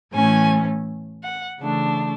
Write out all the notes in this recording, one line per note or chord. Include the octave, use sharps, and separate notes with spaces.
A2 E3 A3 C#4 G#5
F#5
C#3 E3 A3 D4